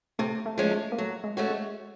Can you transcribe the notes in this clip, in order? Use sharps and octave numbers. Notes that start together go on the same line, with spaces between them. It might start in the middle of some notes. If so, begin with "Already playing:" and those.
C3 A3
A3
F3 G#3 C#4
A3
A#3
F#3 A3
G#3
A3 C#4 F#4
G#3